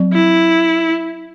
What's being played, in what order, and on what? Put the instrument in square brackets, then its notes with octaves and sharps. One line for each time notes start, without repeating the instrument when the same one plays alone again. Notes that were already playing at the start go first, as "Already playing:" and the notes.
Already playing: [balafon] F#3 C4
[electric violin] E4